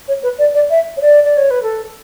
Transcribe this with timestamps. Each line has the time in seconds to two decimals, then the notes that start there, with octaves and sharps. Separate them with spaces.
0.08 C#5
0.23 B4
0.39 D5
0.54 D5
0.70 E5
0.97 C#5
1.01 D5
1.25 D5
1.37 C#5
1.51 B4
1.63 A4